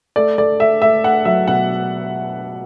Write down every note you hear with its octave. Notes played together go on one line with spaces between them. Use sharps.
A3 D5
A3 D5
A3 E5
A3 E5
A3 F#5
F#3 E5
B2 F#5